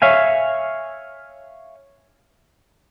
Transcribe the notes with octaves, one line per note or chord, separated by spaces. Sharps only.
C#5 E5 F5 G#5